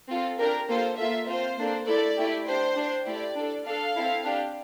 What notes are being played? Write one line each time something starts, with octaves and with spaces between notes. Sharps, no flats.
C4 F4 A4
D4 G4 A#4
A#3 F4 A4 C5
A#3 F4 A4 E5
C4 F4 A4 C5
A#3 D4 A4
A3 E4 A4 D5
A3 E4 G4
D4 G4 C5
D4 G4
A3 E4 G4 D5
D4 A4
D4 A4 F5
C4 E4 A4
D4 G4